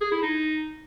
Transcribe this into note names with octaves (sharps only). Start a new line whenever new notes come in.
G#4
E4
D#4